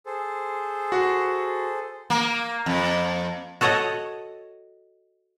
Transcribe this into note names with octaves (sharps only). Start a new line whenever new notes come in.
G#4 A4 C5
F#4 F#5
A#3
F2
F#4 A4 C#5 D#5 F#5